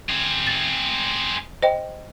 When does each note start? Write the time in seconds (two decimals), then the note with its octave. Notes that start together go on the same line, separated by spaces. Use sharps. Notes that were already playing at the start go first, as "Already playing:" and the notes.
0.10 C4 G#4
0.47 A6
1.62 C5 D#5 G5